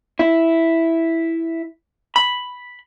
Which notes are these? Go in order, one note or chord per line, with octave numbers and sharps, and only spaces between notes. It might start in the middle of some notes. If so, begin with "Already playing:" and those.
E4
B5